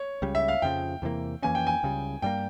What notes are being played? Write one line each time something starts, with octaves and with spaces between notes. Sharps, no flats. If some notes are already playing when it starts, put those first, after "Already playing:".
Already playing: C#5
C#2 C#3 G3
E5
F5
F2 C#3 F3 G5
E2 C3 E3 A#3
F2 E3 A#3 C#4 G#5
G5
G#5
C#2 C#3 G3
G2 G3 A#3 G5